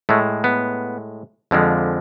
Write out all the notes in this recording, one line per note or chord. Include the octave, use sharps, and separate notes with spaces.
A2 G#3 A3
B3
F2 D3 F3 G#3